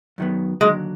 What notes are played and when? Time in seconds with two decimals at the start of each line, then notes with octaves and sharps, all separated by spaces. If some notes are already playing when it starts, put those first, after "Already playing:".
0.18 F#2 D#3 F#3 B3
0.61 D#2 D3 F#3 G#3